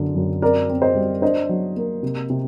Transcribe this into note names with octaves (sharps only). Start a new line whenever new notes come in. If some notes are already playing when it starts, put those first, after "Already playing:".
Already playing: F#2 D3
F#2
C4 A#4 D5
C4
C5 D#5
G3
D4 C5 D#5
F#3
A#3
C3
C3